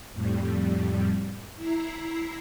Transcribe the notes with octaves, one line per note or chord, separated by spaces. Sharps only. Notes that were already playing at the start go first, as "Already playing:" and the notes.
F2 A2 G3
E4 A#5 C7